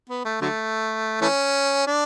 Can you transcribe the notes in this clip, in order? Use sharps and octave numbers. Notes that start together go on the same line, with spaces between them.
B3
A3
D3 F#3 A3
E3 A3 C#4
D4